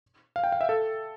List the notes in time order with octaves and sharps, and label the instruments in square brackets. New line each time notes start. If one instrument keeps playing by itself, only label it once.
[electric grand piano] F5
G5
F5
E5
A4